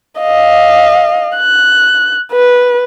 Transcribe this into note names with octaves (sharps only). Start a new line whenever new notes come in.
D#5 F5
F#6
B4